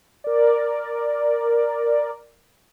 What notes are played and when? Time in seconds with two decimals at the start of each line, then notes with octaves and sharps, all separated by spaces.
0.24 A#4 D5